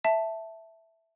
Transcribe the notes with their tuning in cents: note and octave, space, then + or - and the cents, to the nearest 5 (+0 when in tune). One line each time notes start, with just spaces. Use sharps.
E5 +0 A5 +0